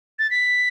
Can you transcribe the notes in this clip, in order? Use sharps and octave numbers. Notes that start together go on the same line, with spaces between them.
A6
B6